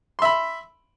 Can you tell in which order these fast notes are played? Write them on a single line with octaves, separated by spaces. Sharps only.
C6 E5 B5